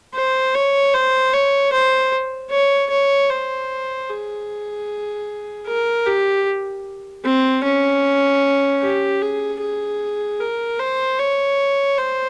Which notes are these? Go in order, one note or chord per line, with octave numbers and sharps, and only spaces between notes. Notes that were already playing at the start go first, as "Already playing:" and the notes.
C5
C#5
C5
C#5
C5
C#5
C#5
C5
G#4
A#4
G4
C4
C#4
G4
G#4
G#4
A#4
C5
C#5
C5